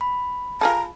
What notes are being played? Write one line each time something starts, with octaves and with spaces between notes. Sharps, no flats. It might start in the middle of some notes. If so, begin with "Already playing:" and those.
B5
F4 G#4 A4 A#5